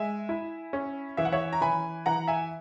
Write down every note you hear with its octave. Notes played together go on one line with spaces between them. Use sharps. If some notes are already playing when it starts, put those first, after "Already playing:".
Already playing: G#3 E5 G#5
E4
C#4
E3 E5
F#5
C#5 E5
A#5
E3 G#5 B5
E3 F#5 A#5
E5 G#5